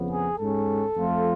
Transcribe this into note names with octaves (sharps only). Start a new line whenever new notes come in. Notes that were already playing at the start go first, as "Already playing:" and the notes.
Already playing: F2 C#3 F3 B3
G#4
G#2 G#3 C#4 A4
F2 F3 A3 F4